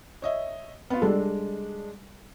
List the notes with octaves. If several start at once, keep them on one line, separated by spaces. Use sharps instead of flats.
C#5 D#5 E5
B3 F4
G3 G#3 D4 A4